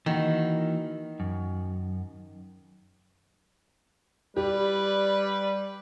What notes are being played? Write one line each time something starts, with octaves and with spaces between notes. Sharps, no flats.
D#3 E3 A#3 F#4
F#2
G3 G4 B4 D5